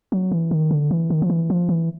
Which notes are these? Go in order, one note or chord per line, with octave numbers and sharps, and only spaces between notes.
F#3
E3
D#3
D3
E3
D#3
F3
E3
F3
E3